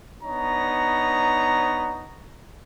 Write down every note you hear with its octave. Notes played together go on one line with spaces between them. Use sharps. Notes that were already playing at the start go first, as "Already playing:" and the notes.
B3 D4 D#4 C#5 A#5